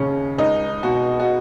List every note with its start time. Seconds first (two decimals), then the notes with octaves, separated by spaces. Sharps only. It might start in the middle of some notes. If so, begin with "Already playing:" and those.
Already playing: D#2 C#3 C#4
0.38 C#2 D#4
0.83 B2 F#4
1.20 F#4